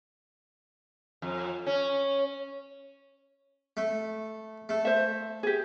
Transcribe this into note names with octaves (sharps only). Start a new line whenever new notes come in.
F2
C#4
A3
A3
C5 E5
G4 G#4